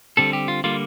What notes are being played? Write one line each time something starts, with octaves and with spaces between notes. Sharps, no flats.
D3 G3 C4 A4
G4
F4
D3 G3 A#3 F4